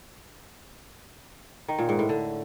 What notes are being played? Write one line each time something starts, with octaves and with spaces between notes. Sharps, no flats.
D#3
A#2
G#2
A2
D3